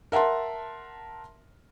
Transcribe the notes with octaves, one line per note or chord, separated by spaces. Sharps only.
A#4 E5 F#5 A5 C6